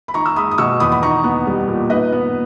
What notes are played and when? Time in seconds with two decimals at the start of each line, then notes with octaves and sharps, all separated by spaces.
0.08 B5
0.14 D#4 A#5 C#6
0.26 E6
0.36 G#3 B5 D#6
0.51 D#6
0.58 B2 C#6 E6
0.80 E2 B5 D#6
0.92 B5
1.03 D#4 A#5 C#6
1.24 B3
1.47 G3
1.68 A#2
1.90 D#4 B4 D#5
2.12 B3